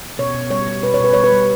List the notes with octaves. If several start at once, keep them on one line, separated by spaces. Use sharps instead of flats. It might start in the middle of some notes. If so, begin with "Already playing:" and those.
B2 C#5
B2
G3 C#5
G3
B2 B4
C#5
B2 B4
G3 C#5
B4
G3